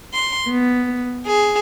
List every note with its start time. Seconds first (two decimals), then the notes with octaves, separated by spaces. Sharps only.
0.11 C6
0.50 B3
1.25 G#4